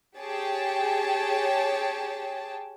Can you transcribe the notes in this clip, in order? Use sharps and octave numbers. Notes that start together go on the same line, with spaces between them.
G4 G#4 C#5 G5 A5